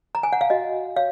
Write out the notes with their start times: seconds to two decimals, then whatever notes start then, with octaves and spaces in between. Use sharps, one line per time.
0.15 A#5
0.23 G#5
0.33 F#5
0.41 F5
0.50 F#4 D#5
0.96 C#5 F5